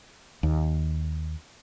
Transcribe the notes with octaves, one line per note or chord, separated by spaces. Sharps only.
D#2